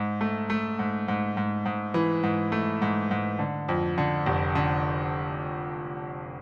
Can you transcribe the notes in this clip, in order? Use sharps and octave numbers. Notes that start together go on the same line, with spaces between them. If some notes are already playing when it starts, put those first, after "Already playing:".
Already playing: G#2
A3
A3
G#2
G#2
G#2
G#2
E3
G#2
A3
G#2
G#2
D3
F2
D3
F1
D3